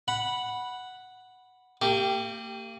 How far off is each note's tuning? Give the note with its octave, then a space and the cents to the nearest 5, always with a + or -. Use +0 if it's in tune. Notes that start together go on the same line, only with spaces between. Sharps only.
F#5 +0 B5 -10
A#3 -40 G4 +0